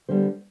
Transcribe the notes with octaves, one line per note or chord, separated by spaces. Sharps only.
D3 G3 B3 C5